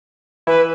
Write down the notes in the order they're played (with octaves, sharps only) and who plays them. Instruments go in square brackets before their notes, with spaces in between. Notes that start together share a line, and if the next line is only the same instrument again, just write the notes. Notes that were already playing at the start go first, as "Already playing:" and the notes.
[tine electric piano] E3 E4 [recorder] B4